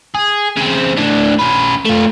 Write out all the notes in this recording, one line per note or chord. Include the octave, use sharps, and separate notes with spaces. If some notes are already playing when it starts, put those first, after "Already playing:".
G#4
C#3 C4
A2 D4
C#4 B4
A3 F4